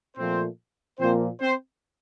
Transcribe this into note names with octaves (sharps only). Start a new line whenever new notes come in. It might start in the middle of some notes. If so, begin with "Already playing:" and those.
A#2 F3 A3 C4 C5
A#2 F3 A#3 C4 C5
C4 C5